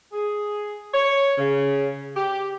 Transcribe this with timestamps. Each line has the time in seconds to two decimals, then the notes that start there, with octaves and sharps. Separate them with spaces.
0.13 G#4
0.94 C#5
1.37 C#3
2.16 G4